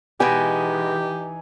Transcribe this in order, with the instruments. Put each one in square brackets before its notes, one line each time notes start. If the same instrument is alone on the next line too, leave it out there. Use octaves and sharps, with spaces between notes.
[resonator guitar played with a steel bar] B2 G#3 B3 [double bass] E3 D#4 [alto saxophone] G4 [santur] G#5